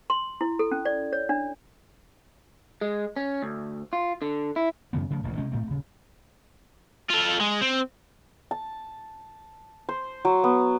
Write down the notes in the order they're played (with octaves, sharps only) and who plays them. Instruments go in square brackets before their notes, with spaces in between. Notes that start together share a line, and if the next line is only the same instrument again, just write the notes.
[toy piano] C6
E4
A4
C#4
D5
C#5
D4
[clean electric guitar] G#3
C#4
D2
F4
D3
E4
[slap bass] F#2 C#3 E3 B3
C#3 F3 A3
E1 A1 D2
C3 G#3 C4 C#4
A2 A3 C4
D#1 C#3
[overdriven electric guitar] F4 A4
G#3
C4
[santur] A5
C5
F#3
B3